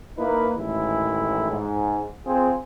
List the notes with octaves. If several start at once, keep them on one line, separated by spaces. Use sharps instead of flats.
A#3 D#4 E4 B4
A1 A2 D#3 G#3 E4
G#2
C4 F4 G#4